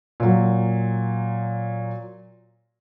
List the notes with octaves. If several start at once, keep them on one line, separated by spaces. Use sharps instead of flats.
A#2 F#3